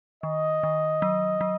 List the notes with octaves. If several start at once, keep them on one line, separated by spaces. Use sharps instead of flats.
D#3 D#5
D#3
F#3
F#3